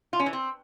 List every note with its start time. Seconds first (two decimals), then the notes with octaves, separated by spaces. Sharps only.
0.13 F4
0.20 C#4
0.26 E3
0.33 C4